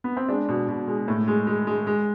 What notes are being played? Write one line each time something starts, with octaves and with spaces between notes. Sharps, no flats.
B3
C4
G#3 D4
B2
B2
G#3
A2
G#3
G#3
G#3
G#3